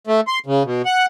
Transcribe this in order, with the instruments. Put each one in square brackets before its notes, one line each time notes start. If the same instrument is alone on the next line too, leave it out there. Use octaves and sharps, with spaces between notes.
[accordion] A3
C6
C#3
B2
F#5